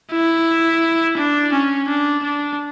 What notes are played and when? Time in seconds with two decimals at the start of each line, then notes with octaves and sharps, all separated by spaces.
0.11 E4
1.17 D4
1.53 C#4
1.88 D4
2.23 D4